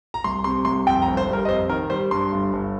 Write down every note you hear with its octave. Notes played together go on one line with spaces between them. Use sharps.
A#5
C2 C6
C3 C6
C2 C6
F2 G5
A#5
G1
C5
G3
A#4
D#5
F2 C5
D#3 A#4
G3 C5
G2 C6
G1
G1